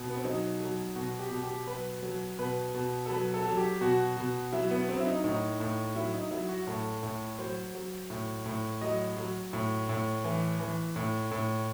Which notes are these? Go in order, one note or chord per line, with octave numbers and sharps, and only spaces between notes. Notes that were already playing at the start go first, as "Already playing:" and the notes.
Already playing: B2
B3
C4
F#3 D#4
F#3
B2 F#4
G4
B2
G4
F#3 B4
F#3
B2 B4
B2
A4
F#3 B4
A4
F#3
G4
B2 F#4
B2
F#3 E4
B3
F#3 C4
E4
D#4
A2 D#4
A2
F#3 E4
D#4
F#3 E4
F#4
A2 A4
A2
F#3 C5
F#3
A2
A2
F#3 D#5
F#3
A2
A2
E3
E3
A2
A2